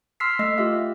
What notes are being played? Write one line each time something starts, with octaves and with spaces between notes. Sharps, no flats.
C6 E6 F6 B6 C7
A3 D#5 E6
F4 G4 E5